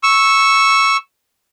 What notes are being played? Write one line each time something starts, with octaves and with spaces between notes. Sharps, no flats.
C#6 E6